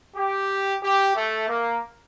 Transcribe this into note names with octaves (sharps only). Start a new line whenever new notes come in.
G4
G4
A3
A#3